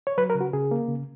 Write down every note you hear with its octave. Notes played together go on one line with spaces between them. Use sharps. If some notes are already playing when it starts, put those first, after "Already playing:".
C#5
F#3 B4
A#4
C#3
F#4
C#3 G#4
A#3
C#3